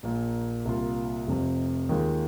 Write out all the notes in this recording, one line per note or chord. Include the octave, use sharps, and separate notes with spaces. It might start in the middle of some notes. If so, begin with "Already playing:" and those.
A#1 A#2 A#3
C2 A#2 A#3 F4
F1 F2 C3
D#2 D#3 G#3 F4